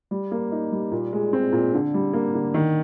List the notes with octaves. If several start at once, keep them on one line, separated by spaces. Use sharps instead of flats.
G3
A#3
D#4
G3
A#2
G#3
C4
A#2
D3
G3
A#3
D3
D#3